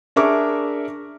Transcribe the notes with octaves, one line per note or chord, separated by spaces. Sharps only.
D4 G#4 A#4 E5 C#6 D6